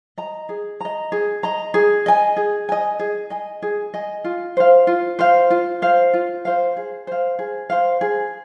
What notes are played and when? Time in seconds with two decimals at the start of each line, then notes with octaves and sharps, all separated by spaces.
0.18 D#5 A#5
0.49 G#4
0.81 D#5 A#5
1.12 G#4
1.43 D#5 A#5
1.74 G#4
2.06 D#5 G#5
2.37 G#4
2.69 D#5 G#5
2.99 G#4
3.30 D#5 G#5
3.62 G#4
3.94 D#5 G#5
4.24 F4
4.57 C5 F5
4.87 F4
5.19 C5 F5
5.50 F4
5.82 C5 F5
6.13 F4
6.45 C5 F5
6.77 G#4
7.07 C5 F5
7.39 G#4
7.70 C5 F5
8.01 G#4